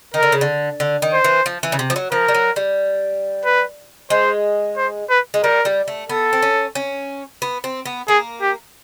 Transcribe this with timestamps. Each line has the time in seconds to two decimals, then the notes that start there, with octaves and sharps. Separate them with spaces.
0.14 D#3 A#4
0.23 D3
0.32 C#3
0.41 D3
0.80 D3
1.02 D#3
1.13 C5
1.24 E3
1.46 F3
1.63 E3
1.72 C#3
1.79 C3
1.90 F3
1.96 F#3
2.12 F3 A#4
2.28 G3
2.34 F#3
2.56 G3
3.45 B4
4.10 G#3 C5
4.77 C5
5.10 B4
5.34 G#3
5.44 G3 A#4
5.65 G3
5.88 A3
6.09 B3 A4
6.33 C4
6.42 C#4
6.75 C#4
7.42 B3
7.64 C4
7.86 B3
8.08 A#3 G#4
8.42 G4